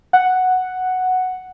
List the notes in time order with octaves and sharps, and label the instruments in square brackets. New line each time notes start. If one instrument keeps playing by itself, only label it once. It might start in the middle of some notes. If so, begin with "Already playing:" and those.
[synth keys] F#5